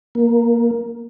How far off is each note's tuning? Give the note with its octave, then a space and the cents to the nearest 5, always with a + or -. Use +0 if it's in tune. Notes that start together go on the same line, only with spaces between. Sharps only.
A#3 +10